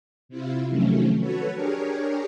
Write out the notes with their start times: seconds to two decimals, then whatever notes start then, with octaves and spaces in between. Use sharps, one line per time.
0.29 C3 E4 F4
0.68 C3 D#3 F3 F#3 A3 C#4
1.19 F#4 A4 B4 C#5
1.54 D4 G4 G#4 A#4 C#5